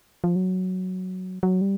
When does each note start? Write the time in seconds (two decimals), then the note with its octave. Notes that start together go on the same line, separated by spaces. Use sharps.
0.24 F3
0.36 F#3
1.43 F#3
1.61 G3